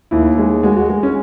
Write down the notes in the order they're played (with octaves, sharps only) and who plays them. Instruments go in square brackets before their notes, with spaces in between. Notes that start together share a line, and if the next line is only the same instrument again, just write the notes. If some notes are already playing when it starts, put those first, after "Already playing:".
[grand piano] D#2 E4
G#3
G#3 F#4
F#4
G#3
C#4